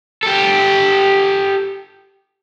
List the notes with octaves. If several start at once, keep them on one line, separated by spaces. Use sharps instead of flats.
G4 A4